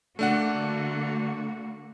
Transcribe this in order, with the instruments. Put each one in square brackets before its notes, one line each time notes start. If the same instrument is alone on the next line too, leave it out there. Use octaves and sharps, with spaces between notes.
[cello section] D3 A#3 F#4 [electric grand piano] A3 D4 F#5